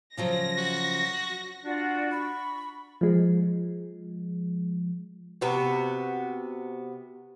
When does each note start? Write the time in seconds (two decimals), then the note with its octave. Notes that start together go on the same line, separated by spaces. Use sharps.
0.17 C#3 F3 F#3 A#6
0.58 F#4
1.64 D4 F4 F#4 D5
2.11 B5 C#6
3.01 F3 G#3
5.41 C3 B3 F#4